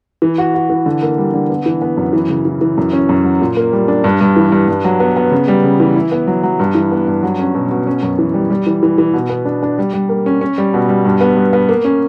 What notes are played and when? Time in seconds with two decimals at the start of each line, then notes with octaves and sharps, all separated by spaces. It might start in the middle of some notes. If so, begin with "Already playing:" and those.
0.22 E3
0.38 F#4
0.54 F#4
0.70 E3
0.86 D3
1.02 A#3
1.18 G3
1.34 D3
1.49 B3
1.66 E3
1.82 B3
1.97 F#2
2.13 E3
2.29 C#3
2.45 E3
2.61 E3
2.77 F#2
2.93 C#4
3.09 F#2
3.24 F#3
3.41 A#2
3.57 A#3
3.73 G3
3.88 D4
4.04 G2
4.21 G2
4.36 E3
4.52 G2
4.68 G2
4.85 F#3
5.00 B3
5.17 B3
5.31 C#3
5.48 G3
5.64 C#3
5.80 E3
5.96 E4
6.12 B3
6.27 F#3
6.43 F#3
6.60 G2
6.75 E3
6.91 B3
7.08 G2
7.23 F#3
7.39 C#4
7.54 B2
7.71 B2
7.87 C#4
8.03 F#2
8.19 E3
8.34 G3
8.50 G3
8.67 E3
8.83 E3
8.98 E3
9.14 B2
9.30 B3
9.45 D4
9.63 D4
9.78 G3
9.93 G3
10.09 A#3
10.26 C#4
10.41 C#4
10.58 G3
10.74 B2
10.89 G3
11.05 G2
11.21 B3
11.37 G2
11.53 B3
11.69 A#3
11.84 C#4